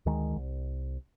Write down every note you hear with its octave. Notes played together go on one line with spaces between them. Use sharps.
D2 D#3 G#3
C2